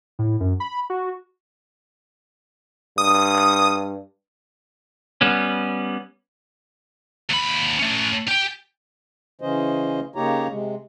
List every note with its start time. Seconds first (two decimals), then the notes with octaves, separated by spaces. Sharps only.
0.19 A2
0.40 F#2
0.60 B5
0.90 F#4
2.98 G2 D#6
5.21 G3 B3 C#4
7.30 D#2 B5
7.79 A3 C#4
8.28 G4 G5
9.41 C#3 E3 C#4 C5 D#5
10.16 C#3 A#3 D#4 G4 C#5 A#5
10.50 C3 G#3